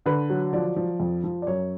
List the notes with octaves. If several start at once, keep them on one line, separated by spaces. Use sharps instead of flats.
D3 B4
F#3
F3 D5
F3
F2
F3
D5
F#2 C#5